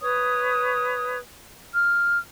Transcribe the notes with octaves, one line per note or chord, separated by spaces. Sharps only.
B4 C#5 D#6
F6